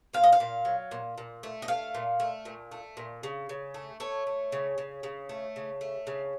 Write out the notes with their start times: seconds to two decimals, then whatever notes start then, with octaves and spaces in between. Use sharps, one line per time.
0.13 A#2 F5
0.23 D#5
0.32 F5
0.40 A#2
0.65 F#3
0.91 A#2
1.18 A#2
1.43 A3
1.62 D#5
1.68 A3 F5
1.95 A#2
2.20 A3
2.45 A#2
2.72 A3
2.97 A#2
3.23 C#3
3.49 C#3
3.74 A3
4.00 A3 C#5
4.27 A3
4.52 C#3
4.78 C#3
5.03 C#3
5.29 A3
5.56 C#3
5.81 A3
6.07 C#3